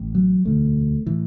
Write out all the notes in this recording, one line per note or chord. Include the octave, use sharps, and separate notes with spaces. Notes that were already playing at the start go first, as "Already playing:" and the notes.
Already playing: A1 A2
F#3
E1 D2 D3 A3
A2 E3